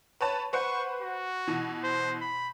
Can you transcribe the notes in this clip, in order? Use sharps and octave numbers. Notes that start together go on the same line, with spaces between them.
B4 C#5 A5
B4 C5 F#5 C#6
F#4
B2 E3
C5
B5